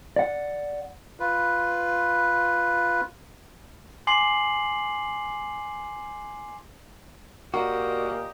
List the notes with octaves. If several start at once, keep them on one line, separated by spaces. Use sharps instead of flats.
D5 F#5
F4 B4
G#5 C6 D6 C7 F#7
A#2 A#3 F#4 G4 D#5